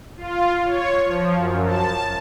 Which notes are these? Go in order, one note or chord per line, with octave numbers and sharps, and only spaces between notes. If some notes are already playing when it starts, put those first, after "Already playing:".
F4
C#5
F3
F#2
A5